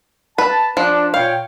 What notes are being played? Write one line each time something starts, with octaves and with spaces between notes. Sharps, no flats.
B4 A5
F3 D4
A#2 C#5 F5 G5